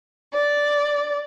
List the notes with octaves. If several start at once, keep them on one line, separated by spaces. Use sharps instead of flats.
D5